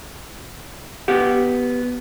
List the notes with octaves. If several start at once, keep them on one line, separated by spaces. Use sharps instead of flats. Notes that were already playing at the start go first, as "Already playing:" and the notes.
B3 G4 F#5